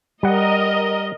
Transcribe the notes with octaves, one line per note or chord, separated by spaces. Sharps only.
G3 A#4 D#5 F#5